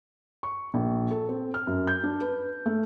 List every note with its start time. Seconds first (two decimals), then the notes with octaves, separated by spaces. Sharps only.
0.43 C#6
0.74 A#1
1.11 A4
1.29 C4
1.54 F6
1.67 F#2
1.87 G6
2.03 D4
2.21 B4
2.66 A3